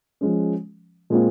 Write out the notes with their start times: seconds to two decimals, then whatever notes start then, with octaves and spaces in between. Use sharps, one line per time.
0.21 F3 G#3 C#4
1.10 A#2 G#3 C4 F4